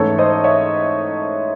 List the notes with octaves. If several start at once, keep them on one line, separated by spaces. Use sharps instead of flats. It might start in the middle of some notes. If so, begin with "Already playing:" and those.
Already playing: G#2 E3 A3 C#4 A4 C#5
C5 D#5
C#5 E5